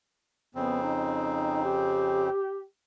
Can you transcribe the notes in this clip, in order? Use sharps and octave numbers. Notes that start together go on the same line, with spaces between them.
F2 C#3 B3 C4
D#4
G4